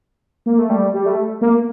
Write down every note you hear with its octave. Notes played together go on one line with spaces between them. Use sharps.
A#3
A3
G3
G3
A3
A#3